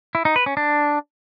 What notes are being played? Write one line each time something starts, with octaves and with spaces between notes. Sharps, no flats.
E4
D#4
B4
C#4
D4